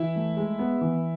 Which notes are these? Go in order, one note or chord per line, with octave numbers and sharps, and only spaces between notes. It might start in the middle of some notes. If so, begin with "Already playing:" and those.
Already playing: E3 E4 E5
A3
G#3
B3
E3